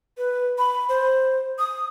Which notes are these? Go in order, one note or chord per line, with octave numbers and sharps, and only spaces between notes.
B4
B5
C5
D#6